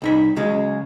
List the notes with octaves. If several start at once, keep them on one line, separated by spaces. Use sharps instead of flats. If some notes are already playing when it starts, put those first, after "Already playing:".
C2 D#4 B5
C#3 F#3 G#3